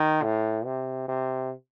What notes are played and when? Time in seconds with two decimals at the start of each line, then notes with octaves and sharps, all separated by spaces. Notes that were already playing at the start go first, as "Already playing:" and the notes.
Already playing: D#3
0.23 A2
0.65 C3
1.08 C3